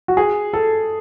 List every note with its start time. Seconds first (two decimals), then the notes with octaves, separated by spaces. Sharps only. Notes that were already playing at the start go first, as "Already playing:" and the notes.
0.08 F#4
0.17 G#4
0.53 A4